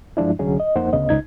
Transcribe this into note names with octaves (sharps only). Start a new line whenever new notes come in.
G2 F3 G#3 D4 E4
C2 D3 F#3 C#4 G#4
D#5
F2 A#3 D#4 C5 F#5
D2 C#3 B3 D#5
C#2 D#4 G#6